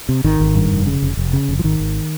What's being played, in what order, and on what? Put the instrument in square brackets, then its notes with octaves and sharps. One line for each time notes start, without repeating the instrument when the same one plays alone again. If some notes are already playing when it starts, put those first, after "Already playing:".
[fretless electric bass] C3
G#1 D#3
G#1
G2
F1
C#3
F1
F1
C#3
F1
F3
G#1 D#3
G#1